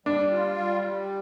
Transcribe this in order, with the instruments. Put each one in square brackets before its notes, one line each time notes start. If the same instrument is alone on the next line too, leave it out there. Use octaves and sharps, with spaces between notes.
[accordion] G3 [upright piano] D4
[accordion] F4
G3
G3